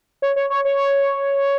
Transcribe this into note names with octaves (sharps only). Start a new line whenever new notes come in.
C#5
C#5
C#5
C#5